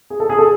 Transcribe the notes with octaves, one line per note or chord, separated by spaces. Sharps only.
G#4
A4
G#4
A4